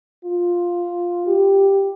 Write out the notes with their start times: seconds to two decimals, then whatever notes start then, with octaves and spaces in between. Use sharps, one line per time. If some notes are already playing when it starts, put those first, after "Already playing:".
0.24 F4
1.27 G4